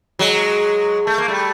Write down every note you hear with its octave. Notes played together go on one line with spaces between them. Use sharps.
F#3 G#3
A3
A#3
G3 A3